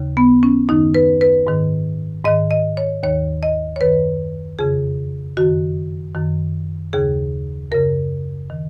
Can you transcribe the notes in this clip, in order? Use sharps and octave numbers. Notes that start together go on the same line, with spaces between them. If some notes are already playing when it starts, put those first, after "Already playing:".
Already playing: D#2 C#3
B3
C#4
F#2 D#3 D#4
B4
B4
G#2 D#3
G#2 D#3 D#5
D#5
C#5
D#2 D#3 C#5
D#5
C#5
F#2 D#3 B4
F2 C#3 G#4
F#2 D#3 F#4
F#2 D#3
D#2 C#3 G#4
F#2 C#3 A#4
D#3